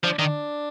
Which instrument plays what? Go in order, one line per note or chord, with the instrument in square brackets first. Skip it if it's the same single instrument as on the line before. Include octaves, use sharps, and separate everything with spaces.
[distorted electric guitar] F3 [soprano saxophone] D4
[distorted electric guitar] D#3 [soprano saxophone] D4